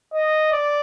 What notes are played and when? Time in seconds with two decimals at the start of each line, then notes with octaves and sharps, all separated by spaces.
0.14 D#5
0.52 D5